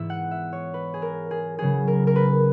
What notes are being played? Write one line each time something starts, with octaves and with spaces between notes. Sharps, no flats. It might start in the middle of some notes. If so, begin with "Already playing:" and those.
Already playing: G#2 E3 B3 E4 E5
F#5
E5
C#5
B4
G#4
A#4
G#4
C#3 F#3 B3 G#4
A#4
A#4
B4